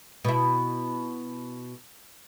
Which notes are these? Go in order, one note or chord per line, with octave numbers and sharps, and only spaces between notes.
B2 E4